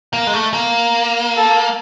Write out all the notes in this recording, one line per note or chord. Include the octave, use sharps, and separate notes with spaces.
A#3
G#3
A3
A#3
A4